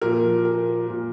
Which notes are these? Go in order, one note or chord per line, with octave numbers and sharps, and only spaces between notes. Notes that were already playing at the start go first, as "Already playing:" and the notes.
A#2 F3 A#4
A#4
A#2 F3